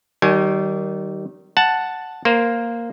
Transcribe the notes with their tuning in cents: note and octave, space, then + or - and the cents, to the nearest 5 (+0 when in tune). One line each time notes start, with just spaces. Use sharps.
D#3 +0 G3 -35 G#5 +15
F#5 +0 A5 +0
A#3 +0 C5 -5